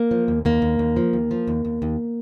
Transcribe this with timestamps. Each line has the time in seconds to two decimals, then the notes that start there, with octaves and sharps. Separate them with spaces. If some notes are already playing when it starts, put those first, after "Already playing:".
Already playing: A#3
0.11 F3
0.28 D#2
0.45 D#2 A#3
0.62 D#2
0.79 D#2
0.96 F3
1.13 D#2
1.31 F3
1.48 D#2
1.65 D#2
1.82 D#2